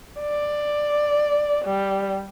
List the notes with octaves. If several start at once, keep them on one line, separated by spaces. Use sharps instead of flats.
D5
G3